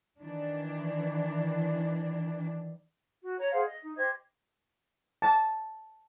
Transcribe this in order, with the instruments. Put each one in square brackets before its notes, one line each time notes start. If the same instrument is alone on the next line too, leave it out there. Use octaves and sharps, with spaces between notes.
[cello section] D#3 E3 D4
[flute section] F#4
C#5 A#5
G#4 C5 F5 F#5
D#5
D#4
G4 C5 D#5 G#6
[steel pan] A5